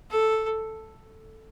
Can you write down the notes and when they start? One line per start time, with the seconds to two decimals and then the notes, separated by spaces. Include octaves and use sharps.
0.10 A4